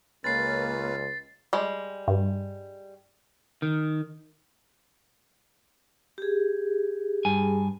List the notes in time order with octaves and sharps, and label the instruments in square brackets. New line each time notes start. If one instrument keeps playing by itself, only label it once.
[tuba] C#2 [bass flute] A#3 [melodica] C#4 F4 B4 [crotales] A6 C7
[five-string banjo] G3 G#3
[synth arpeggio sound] G2
[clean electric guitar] D#3
[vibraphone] G4 G#4
[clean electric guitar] G2 G#5